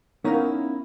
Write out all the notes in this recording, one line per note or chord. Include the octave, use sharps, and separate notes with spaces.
B3 C#4 D#4 E4 A#4 F5